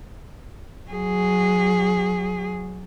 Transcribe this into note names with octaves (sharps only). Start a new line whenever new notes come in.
F#3 G#4